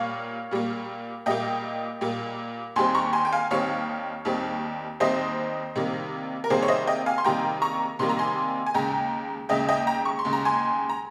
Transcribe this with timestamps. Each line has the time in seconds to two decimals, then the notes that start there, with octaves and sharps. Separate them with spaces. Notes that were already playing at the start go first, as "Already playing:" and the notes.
Already playing: A#2 G3 A#3 C#5 F5
0.51 A#2 G3 A#3
1.26 A#2 G3 A#3 D#5 G5
2.01 A#2 G3 A#3
2.76 D#2 D#3 G3 C4 G#5 C6
2.95 A#5 C#6
3.13 G#5 C6
3.25 G5
3.33 F5 G#5
3.51 D#2 D#3 G3 C4 C#5 F5
4.25 D#2 D#3 G3 C4
5.00 D#2 D#3 G3 C4 C5 D#5
5.76 C3 D#3 G3 A#3
6.44 A#4
6.50 C3 D#3 G3 A#3 G#4 C5
6.63 C#5
6.68 C5 D#5
6.87 D#5 G5
7.06 F5 G#5
7.18 C6
7.24 C3 D#3 G3 A#3 G5 A#5
7.62 A#5 C#6
7.99 C3 D#3 G3 A#3 C6
8.09 A#5
8.19 G#5 C6
8.66 G#5
8.74 D#2 C#3 G#3 G5 A#5
9.49 D#2 C#3 G#3 D#5 G5
9.69 D#5 G5
9.87 G5 A#5
10.05 C#6
10.19 C6
10.25 D#2 C#3 G#3
10.33 A#5
10.45 G#5 C6
10.89 A#5